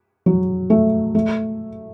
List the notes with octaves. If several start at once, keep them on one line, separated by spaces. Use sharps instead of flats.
F#3
A3
A3